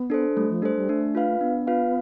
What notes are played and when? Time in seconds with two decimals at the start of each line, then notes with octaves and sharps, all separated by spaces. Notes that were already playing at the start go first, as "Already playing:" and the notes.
Already playing: B3
0.10 D4 A4 C5
0.36 G3 A3
0.49 F3
0.62 G3 D4 A4 C5
0.76 G3
0.89 A3 D4
1.15 F4 B4 F5
1.41 B3 D4
1.67 F4 B4 F5